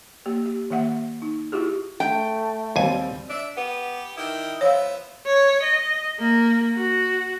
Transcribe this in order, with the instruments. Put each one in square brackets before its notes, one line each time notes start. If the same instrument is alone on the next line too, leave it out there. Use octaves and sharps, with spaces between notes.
[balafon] A#3 G4
G4
D#3 A#3 E5 F#5
D#4
E4 F4 G4 G#4
[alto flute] A3 [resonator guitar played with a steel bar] G5
[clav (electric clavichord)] D#2 G#5 [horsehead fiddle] G3 C4
[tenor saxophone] D4 [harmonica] E5
[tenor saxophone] B3 [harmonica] G4
[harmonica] D#3 G5 D#6 [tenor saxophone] E4
[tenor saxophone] F3 [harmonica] B3 E5 [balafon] C#5 F5
[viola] C#5
D#5
A#3
F#4